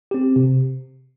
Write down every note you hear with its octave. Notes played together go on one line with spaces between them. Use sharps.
C4 G4
C3